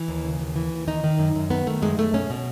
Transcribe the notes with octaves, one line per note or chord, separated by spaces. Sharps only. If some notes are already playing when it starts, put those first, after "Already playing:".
Already playing: E3
D#2
C#3
D#2
E3
D#2
D#3 D#4
D#3
F#2
F#2
D#3 B3
D#3 A3
F#2 G#3
F#2 A3
B2 C#4
B2